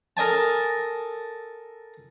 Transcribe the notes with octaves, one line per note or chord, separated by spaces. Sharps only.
A4 A#4 D#5 G#5 A5